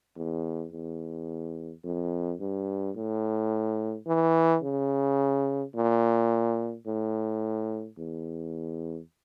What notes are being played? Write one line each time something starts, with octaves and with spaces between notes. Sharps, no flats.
E2
E2
F2
G2
A2
E3
C#3
A#2
A2
E2